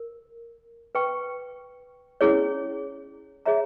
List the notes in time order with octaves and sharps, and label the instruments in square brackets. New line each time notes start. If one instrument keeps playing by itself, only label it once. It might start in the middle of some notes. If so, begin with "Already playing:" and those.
Already playing: [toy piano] A#4
B4 G5 C#6
C#4 E4 G#4 C#5
G#4 C#5 E5 A#5